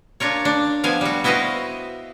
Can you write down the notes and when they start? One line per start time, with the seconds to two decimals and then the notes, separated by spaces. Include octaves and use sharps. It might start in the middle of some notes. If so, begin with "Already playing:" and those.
0.20 D4 F4 A#4 C#5
0.45 D4
0.84 F3 B3 F5 G#5
1.01 G3 F#4
1.24 B3 E4 F#4 C5 D#5 F5